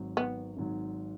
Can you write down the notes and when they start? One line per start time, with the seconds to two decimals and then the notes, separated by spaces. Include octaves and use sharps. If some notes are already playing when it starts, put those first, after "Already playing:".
Already playing: G#1 G#2 F#3
0.17 B3
0.57 G#1 G#2 F#3